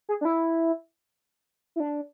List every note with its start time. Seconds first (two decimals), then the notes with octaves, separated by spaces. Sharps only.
0.09 G#4
0.21 D4
0.25 E4
1.76 E4
1.80 D4